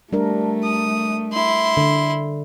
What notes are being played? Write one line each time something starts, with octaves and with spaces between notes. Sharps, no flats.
G3 A3 D4 A#4
D#6
E4 C6
D3